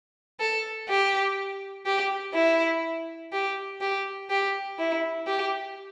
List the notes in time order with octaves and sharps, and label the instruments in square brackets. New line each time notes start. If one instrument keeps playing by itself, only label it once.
[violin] A4
G4
G4
E4
G4
G4
G4
E4
G4